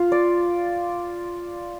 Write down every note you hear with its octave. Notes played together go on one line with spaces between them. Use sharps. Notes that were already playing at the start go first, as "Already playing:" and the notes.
Already playing: F4
D5